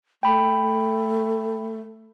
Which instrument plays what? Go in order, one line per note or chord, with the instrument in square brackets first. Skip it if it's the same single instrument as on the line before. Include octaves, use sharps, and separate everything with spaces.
[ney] A3 [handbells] G5 B5